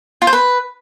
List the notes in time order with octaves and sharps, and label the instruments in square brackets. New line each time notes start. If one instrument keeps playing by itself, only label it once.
[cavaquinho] F4
C5
B4